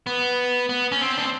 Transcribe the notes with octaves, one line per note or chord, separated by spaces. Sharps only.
B3
B3
C#4
C4
D4